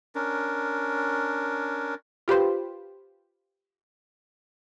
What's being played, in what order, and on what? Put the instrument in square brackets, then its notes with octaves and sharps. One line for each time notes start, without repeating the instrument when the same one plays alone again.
[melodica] C#4 D4 A#4
[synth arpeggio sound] F4 G4 B4 C5